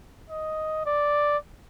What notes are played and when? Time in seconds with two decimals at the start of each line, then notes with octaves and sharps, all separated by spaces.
0.30 D#5
0.86 D5